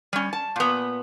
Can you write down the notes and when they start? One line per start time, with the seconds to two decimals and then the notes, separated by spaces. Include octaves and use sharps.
0.13 G3 C#4
0.33 A5
0.56 A#2 B3